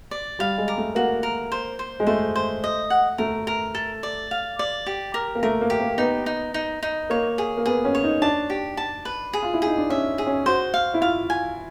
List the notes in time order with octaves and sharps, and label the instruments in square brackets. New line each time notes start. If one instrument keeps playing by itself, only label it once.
[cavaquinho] D5
[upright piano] G3 [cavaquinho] F5
[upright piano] G#3
[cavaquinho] A#4
[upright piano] A3
[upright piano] A#3 [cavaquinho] F#4
[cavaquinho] A#4
C5
C5
[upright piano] G#3
[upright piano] A3 [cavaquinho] C5
[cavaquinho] C5
D#5
F#5
[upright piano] A3 [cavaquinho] A#4
[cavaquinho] A#4
A4
D5
F5
D5
G4
A#4
[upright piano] A#3
[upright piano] A3 [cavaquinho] A#4
[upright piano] A#3
[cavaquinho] G4
[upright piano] A#3
[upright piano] B3 [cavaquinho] D#4
[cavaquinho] D#4
D#4
D#4
[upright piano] A#3 [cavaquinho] C#5
[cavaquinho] G#4
[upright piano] A#3
[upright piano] B3 [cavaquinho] G#4
[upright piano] C#4
[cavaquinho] C#5
[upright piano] D#4
[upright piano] D4 [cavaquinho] A5
[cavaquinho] G4
A5
B4
G#4
[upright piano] F4
E4
[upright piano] D#4 [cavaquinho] G#4
[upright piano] D4
[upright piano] C#4 [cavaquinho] E5
[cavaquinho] G#4
[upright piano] C#4
[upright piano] F#4 [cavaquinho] C5
[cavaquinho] F5
[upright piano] E4
[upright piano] F4 [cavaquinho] F5
[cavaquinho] G#5